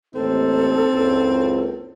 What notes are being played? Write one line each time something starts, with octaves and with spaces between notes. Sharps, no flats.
A1 D#2 C4 D#4 A4
F#1 C#2